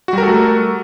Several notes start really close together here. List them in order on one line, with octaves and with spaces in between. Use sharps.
F#4 G3 A#4 A4 A3